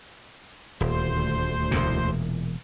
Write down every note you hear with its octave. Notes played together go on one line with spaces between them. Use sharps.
D#1 D2 C5
E1 E2 A#2